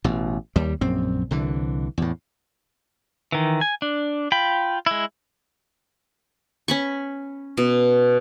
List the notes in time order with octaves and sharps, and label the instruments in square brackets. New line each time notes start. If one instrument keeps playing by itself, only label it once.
[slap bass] A1 B2
D#2 G3
A#1 F#2 C4
C2 D3 E3
E2 A2
[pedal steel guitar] D#3 E3
G#5
D4
F4 G5 B5
G#3 E4
[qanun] C#4 B5 C#6
B2